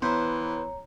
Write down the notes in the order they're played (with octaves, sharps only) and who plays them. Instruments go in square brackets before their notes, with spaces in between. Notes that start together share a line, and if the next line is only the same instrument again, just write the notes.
[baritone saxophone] E3 [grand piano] B3 [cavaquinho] C5 [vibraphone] C#5 A#5